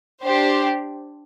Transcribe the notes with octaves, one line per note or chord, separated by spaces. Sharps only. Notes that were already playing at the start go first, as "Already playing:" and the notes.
D4 G4 C5